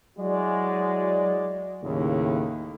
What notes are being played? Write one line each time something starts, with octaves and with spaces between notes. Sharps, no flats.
F#3 G#3 E4 F#4 D5
D#2 A2 C#3